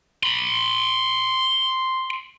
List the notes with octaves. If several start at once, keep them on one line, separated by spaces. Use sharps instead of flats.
B5 C6